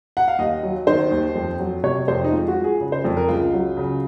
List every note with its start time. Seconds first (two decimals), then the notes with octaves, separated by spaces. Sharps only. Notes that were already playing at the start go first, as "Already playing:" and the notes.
0.17 F#5
0.28 F5
0.39 D#2 D#5
0.63 F#3
0.87 D#3 C5
1.11 D#2
1.35 F2
1.59 F#3
1.83 C3 C#5
2.08 F2 C5
2.24 D#4
2.32 G#3 F4
2.48 F#4
2.56 F3
2.64 G#4
2.80 C#3
2.92 C5
3.05 F2
3.17 A#4
3.28 C#2 F4
3.53 F#3
3.77 C#3